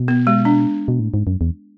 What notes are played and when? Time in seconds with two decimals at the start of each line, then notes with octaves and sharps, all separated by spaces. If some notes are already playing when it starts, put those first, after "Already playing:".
Already playing: B2
0.08 B3
0.27 G#3
0.45 D4
0.88 B2
1.00 A2
1.14 G#2
1.27 F#2
1.41 E2